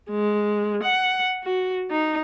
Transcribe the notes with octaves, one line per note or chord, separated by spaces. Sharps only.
G#3
F#5
F#4
D#4